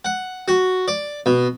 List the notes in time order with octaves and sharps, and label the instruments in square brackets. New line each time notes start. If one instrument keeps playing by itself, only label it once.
[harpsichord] F#5
F#4
D5
B2